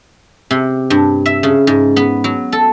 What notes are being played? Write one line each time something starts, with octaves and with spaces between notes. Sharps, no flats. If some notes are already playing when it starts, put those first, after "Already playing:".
C3
G2
E5
C#3
G#2
B3
F#3
A4